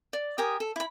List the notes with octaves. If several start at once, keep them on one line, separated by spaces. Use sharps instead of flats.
D5
G4 A#4 G#5 D#6
A4
E4 B5